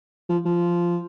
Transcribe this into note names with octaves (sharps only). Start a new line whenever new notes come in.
F3
F3